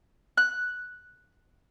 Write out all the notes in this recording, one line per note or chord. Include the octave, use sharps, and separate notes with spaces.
F#6